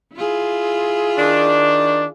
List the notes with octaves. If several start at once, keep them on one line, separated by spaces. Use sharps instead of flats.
E4 F4 G#4
D#3 D4